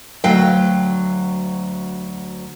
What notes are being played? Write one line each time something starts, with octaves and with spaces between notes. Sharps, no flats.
D2 F#3 F5 G5